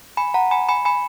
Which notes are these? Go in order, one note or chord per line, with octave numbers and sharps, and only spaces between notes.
G#5 B5
F#5 A#5
G#5 B5
G#5 B5
G#5 B5